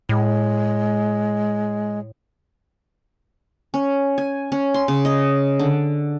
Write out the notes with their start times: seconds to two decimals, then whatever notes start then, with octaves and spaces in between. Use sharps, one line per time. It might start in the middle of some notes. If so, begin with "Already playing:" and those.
0.09 A2 G#3
3.74 C#4
4.18 G#5
4.52 C#4
4.74 C6
4.88 C#3
5.05 D#5
5.59 D3